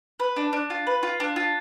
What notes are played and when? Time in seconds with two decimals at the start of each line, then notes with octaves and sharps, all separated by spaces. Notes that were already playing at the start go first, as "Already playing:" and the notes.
0.20 B4
0.36 D4
0.53 D4
0.70 F4
0.87 B4
1.03 F4
1.20 D4
1.36 F4